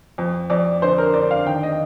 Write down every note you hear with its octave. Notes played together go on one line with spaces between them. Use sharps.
F2
F2 D5
D3 C5
A#4
D3 D5
F5
D#3 G5
D#5